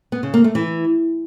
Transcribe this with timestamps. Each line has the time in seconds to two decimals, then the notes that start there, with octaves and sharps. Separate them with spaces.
0.12 B3
0.23 C#3
0.34 A#3
0.44 A3
0.55 E3